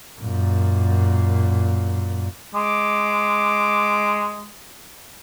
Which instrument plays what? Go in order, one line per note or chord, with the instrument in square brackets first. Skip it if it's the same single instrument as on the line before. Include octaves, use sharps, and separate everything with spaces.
[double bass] F#2 A#2
[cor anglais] G#3 [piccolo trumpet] D6